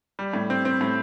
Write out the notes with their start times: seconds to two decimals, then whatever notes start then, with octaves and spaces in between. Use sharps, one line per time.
0.19 G3
0.34 A2
0.50 C4
0.65 C4
0.81 A2